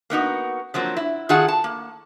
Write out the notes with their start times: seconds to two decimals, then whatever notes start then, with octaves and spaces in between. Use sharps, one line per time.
0.10 A#3 B3 D#4 F#4
0.74 F3 F#3 A#3 C4
0.97 E4
1.29 D#3 F4 F#4 G#4 F#5 A5
1.48 A5
1.64 A#3